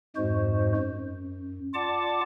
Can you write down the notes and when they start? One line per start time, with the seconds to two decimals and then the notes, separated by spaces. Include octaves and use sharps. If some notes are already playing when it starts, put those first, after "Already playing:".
0.16 F2 G#2 G#3 F#4 C5
0.77 F#2
1.74 F4 D5 F#5 A5 D6